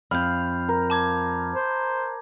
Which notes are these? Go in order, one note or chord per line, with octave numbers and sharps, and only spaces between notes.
F2 F5 B5 G6
A#4
A5 D6 G#6
C5